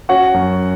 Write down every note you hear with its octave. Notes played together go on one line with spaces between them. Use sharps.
C#4 F#4 F#5
F#2